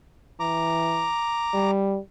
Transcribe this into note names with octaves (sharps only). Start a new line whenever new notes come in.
E3 A#5 D6
G3